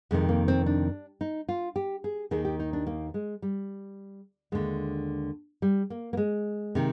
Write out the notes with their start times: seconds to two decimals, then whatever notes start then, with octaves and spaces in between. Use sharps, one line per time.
0.11 F2 C3 D#3 G#3
0.29 A#3
0.48 C4
0.66 D4
1.21 D#4
1.49 F4
1.76 G4
2.04 G#4
2.31 D#2 D#3 G#4
2.45 G4
2.60 D#4
2.73 D4
2.87 A#3
3.14 G#3
3.42 G3
4.52 D#2 D3 G#3
5.62 G3
5.90 A#3
6.13 A#3
6.17 G#3
6.75 C3 D#3